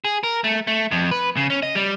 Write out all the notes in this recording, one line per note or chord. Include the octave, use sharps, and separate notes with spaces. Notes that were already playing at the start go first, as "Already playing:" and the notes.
G#4
A#4
A3
A3
F2
B4
C#3
C#4
D#5
G3